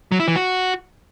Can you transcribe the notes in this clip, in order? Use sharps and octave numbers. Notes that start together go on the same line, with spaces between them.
F#3
E4
E3
F#4